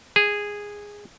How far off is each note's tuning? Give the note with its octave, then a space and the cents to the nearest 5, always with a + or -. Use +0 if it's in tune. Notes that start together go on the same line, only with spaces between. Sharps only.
G#4 -10